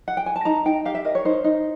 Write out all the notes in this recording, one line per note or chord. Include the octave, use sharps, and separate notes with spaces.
F#5
G5
G#5
A5
D#4 A#5
D#4 G5
G4 F5
E5
A#4 D#5
C#5
D#4 C5
D#4